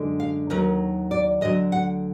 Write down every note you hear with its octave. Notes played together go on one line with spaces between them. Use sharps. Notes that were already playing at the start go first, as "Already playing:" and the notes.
Already playing: F#2 D3 G#3
F5
D#2 D#3 F#3 A#4
D5
D2 D3 F#3 D#5
F#5